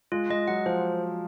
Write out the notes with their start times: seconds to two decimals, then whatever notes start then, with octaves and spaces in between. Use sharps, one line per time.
0.12 G#3 F4
0.30 G#3 D#5
0.48 F#3 F#5
0.66 F3 C5